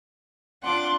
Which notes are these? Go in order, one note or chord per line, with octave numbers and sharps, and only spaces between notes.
C4 D4 F4 F#5 C6 D6